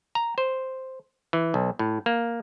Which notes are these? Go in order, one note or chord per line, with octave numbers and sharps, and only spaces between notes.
A#5
C5
E3
B1
A2
A#3